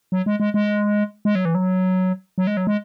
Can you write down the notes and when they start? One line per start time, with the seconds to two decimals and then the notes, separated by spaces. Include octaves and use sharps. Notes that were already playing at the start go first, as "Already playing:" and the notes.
0.12 F#3
0.26 G#3
0.40 G#3
0.54 G#3
1.25 G#3
1.35 F#3
1.45 E3
1.55 F#3
2.38 F#3
2.47 G#3
2.57 F#3
2.67 G#3